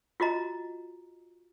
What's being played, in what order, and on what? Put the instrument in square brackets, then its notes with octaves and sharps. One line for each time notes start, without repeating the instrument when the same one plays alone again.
[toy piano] F4 F#4 D#5 A#5